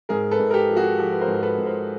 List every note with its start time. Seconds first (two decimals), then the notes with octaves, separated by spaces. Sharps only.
0.09 G#2 G#4 A#4
0.31 A4 B4
0.39 G#2
0.51 A#4
0.54 G4 A4
0.69 F3
0.76 F#4 G#4
0.98 F3 G4 A4
1.12 B4
1.21 A#4 C5
1.28 G#2
1.34 A#4
1.43 A4 B4
1.58 G#2
1.66 A#4 C5